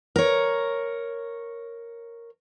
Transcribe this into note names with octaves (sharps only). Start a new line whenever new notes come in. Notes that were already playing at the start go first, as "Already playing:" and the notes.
A#4 C#5